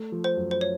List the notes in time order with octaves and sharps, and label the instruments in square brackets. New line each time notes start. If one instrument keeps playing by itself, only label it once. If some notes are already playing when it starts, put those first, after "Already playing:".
Already playing: [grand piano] A3
F3
[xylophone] C5
[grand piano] F#2
[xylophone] C5
C#5